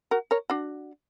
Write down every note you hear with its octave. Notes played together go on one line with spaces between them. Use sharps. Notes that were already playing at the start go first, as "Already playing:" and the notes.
F#4 A#4
A#4 C#5
D4 F#4